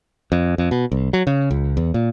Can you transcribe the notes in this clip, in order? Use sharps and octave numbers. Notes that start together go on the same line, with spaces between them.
F2
F2
B2
C2
F#3
C#3
C#2
E2
A#2